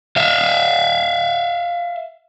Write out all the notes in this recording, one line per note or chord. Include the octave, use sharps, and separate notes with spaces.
E5 F5